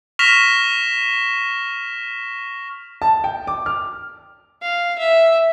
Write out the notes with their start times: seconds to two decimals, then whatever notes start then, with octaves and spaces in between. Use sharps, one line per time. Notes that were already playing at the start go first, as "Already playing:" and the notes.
0.19 C#6 F6 A#6 B6 E7 F7
3.02 A5
3.24 G5
3.47 D6
3.66 F6
4.62 F5
4.99 E5